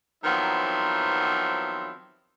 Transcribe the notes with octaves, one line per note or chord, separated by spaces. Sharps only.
D#3 F3 F#3 B3 C4 E4